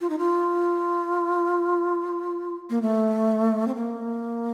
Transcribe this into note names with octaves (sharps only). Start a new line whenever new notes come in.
F4
D#4
F4
A#3
A3
C4
A#3